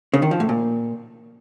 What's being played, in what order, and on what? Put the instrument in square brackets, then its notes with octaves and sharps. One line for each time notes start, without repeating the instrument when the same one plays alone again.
[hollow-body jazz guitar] C#3
D#3
F3
A2
A#2